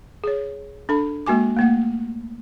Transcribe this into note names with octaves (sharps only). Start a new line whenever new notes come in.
G#4 C#5
D4 A4 B5
G#3 A#3 F#4 G#5 D6
A3 A#3 F#5